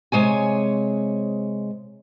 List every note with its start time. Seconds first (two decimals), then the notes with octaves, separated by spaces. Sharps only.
0.12 C3 G#3 C#5 G#5